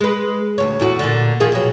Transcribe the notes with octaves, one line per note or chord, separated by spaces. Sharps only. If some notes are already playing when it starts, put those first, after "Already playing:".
G#3 B4
D2 B2 C#5
E2 A2 F#4
A#2 D3
D#3 F3 G#4
F2 B2 F#3